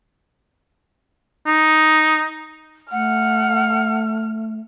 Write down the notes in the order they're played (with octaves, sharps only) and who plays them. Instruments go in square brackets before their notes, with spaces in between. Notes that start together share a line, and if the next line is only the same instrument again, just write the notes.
[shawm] D#4
[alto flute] A3 [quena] F#5 [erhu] F6